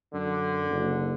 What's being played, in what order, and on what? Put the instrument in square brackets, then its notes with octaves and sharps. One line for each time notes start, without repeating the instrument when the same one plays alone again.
[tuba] F#2 [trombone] D3
[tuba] F#1